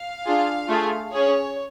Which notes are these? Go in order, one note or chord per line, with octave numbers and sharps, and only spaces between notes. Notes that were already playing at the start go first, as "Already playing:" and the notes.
Already playing: F5
D4 F4 G#4
A3 F4 G#4
C#4 G#4 C#5